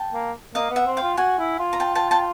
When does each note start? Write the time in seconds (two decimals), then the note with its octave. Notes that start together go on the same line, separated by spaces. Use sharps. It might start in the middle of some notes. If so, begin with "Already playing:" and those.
Already playing: G5 A5
0.13 A#3
0.55 A#3 D#5 F5
0.71 B3
0.76 E5 F#5
0.86 C4
0.97 F5 G5
1.03 F4
1.17 F#4 F#5 G#5
1.39 E4
1.59 F4
1.73 A#5
1.80 G5 A5
1.95 G5 A5
2.11 G5 A5